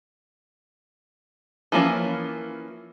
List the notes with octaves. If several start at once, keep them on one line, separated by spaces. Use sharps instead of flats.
E3 F3 A#3 C#4 F4